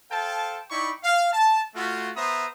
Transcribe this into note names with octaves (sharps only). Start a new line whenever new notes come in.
A4 C5 F5 G5 A5
D#4 E4 D5 G5 B5 C#6
F5
A5
A3 F4 F#4
B3 C5 E5 A#5 D#6